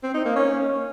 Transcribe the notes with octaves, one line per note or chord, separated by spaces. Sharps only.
C4
D#4
A#3
C#4